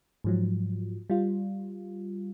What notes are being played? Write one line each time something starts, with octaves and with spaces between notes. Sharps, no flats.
G#2 F3 F#3
G3 F4